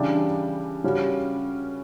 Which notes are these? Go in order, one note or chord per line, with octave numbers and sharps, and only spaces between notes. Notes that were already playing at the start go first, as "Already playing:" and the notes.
Already playing: C#3 E3 G3 D4 G4
C#3 G3 C#4 F#4